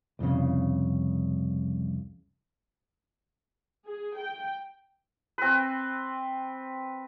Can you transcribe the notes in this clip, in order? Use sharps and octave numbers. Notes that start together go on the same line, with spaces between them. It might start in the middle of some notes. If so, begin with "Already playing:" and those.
C2 F2 A2 C#3
G#4
G5
C4 B4